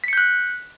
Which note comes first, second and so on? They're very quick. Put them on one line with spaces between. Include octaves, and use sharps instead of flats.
B6 C#7 G6 F#6